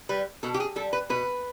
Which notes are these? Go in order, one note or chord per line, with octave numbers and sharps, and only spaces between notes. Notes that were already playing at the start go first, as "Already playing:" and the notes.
G3 B4
B2 A4
G4
G#4
G3 A4
B4
B2 B4